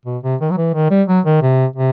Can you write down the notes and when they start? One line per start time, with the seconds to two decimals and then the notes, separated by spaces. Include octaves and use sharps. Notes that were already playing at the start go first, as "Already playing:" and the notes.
0.06 B2
0.24 C3
0.41 D#3
0.51 F#3
0.58 E3
0.74 D#3
0.91 G3
1.08 F#3
1.25 D#3
1.42 C3
1.76 C3